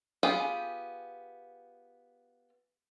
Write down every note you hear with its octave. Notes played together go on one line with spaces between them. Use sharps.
B3 F4 G4 G#4 G5